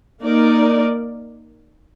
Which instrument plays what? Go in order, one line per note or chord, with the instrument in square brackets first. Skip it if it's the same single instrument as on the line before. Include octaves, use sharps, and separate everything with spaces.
[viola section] A#3 D#4 A#4 D5